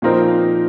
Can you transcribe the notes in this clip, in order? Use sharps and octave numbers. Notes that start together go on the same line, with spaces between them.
A#2 F3 C4 D#4 A#4